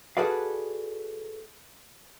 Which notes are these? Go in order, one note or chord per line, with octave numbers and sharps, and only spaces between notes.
F#4 G#4 A4 B4 D5 F5